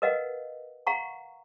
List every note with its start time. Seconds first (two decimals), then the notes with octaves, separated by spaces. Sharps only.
0.02 A#4 B4 D#5 F5 F#5
0.87 F5 F#5 A#5 C#6